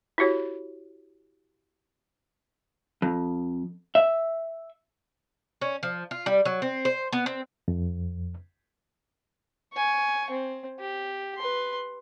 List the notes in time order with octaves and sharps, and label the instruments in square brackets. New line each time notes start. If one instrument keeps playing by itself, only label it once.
[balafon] E4 F#4 G4 C#5
[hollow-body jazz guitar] F2
E5
[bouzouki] C#4
F3
F4
G3
F#3
C4
C5
B3
C4
[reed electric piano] F2
[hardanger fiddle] G#5 C#6
C4
G4
B4 C6